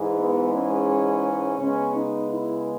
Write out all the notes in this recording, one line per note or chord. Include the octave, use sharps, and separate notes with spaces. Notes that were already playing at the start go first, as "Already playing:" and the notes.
Already playing: G#2 E3 G#3
B3
C#4
C#3 G#3 B3 C#4
D#4
E4